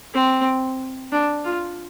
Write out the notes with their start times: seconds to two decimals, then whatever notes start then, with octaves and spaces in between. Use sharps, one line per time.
0.14 C4
1.12 D4
1.45 F4